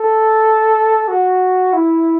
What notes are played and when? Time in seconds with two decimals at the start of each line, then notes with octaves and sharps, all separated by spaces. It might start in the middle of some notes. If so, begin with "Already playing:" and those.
Already playing: A4
1.08 F#4
1.73 E4